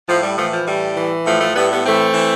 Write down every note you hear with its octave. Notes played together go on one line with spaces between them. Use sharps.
A2 F3
G3
E3 F3 A3
F3
A2 G3
E3
A2 F3 A3
F3 A3
A2 G3 B3
G3 B3
E3 A3 C4
E3